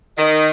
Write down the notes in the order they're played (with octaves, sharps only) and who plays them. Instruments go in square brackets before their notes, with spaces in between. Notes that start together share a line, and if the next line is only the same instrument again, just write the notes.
[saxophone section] D#3